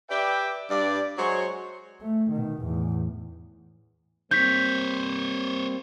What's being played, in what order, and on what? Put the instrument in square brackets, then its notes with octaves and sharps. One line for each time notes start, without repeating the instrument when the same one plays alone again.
[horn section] G4 B4 D5 E5 G5
G2 D5
F#3 G#3 C5 C#5
[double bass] A3
B2 D#3
E2 A2
[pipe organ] G3 A#3 C4 [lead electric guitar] C5 C#5 [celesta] G6 B6